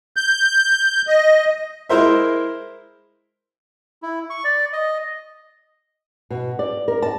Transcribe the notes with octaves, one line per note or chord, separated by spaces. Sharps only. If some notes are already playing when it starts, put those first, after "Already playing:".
G6
D#5
G#3 E4 A#4 C5 E5
E4
C#6
D5
D#5
B2
D5
A#4
A5